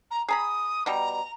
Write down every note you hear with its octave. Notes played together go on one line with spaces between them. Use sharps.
A#5
G#4 A#5 B5 D#6
B2 G3 A#5